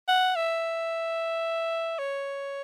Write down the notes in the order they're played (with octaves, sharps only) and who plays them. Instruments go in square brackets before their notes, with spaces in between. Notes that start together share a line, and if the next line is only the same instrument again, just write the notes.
[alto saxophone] F#5
E5
C#5